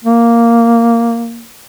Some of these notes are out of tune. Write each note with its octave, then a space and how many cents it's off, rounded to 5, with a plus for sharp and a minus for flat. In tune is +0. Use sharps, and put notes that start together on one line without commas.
A#3 -5